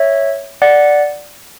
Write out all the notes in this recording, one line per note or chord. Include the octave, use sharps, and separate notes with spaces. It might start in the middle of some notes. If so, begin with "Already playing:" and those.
Already playing: C#5 E5
D5 F#5